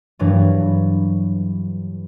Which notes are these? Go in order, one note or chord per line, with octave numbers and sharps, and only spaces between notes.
G2 E3 F#3 A3